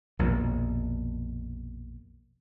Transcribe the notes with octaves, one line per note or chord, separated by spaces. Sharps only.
A#1 F2 B2